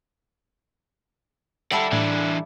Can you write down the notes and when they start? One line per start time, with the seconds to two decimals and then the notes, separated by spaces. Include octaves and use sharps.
1.72 G3 E4 A4 D5 F#5
1.92 A2 E3 D4